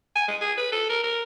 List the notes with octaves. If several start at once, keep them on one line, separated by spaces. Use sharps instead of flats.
G#5
G#3
G#4
B4
A4
A#4
A#4